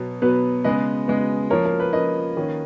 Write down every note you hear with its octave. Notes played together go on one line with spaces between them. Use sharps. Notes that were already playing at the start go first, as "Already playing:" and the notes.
Already playing: B2 F#3 B3
B2 F#3 B3 B4
C#3 G#3 B3 B4 D#5
C#3 G#3 B3
F3 A#3 C#4 A#4 C#5
A#4
B4
F3 A#3 C#4 B4 D#5
D#3 A#3 C#4